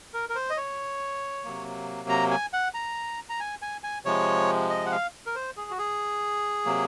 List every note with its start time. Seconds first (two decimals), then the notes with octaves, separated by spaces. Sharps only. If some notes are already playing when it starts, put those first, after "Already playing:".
0.14 A#4
0.29 A#4
0.35 C5
0.50 D#5
0.57 C#5
1.45 C3 F#3 A#3
2.09 A#5
2.31 G#5
2.53 F#5
2.74 A#5
3.30 A#5
3.40 G#5
3.62 G#5
3.83 G#5
4.05 C3 F3 G#3 C#5
4.70 D#5
4.86 F#5
4.92 F5
5.26 A#4
5.35 C5
5.57 G#4
5.71 F#4
5.78 G#4
6.65 C3 F#3 A#3